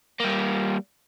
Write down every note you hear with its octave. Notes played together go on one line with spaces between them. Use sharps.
G3 A#3